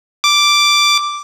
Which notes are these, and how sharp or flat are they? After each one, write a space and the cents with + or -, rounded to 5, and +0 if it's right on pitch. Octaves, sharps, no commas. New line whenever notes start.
D6 +0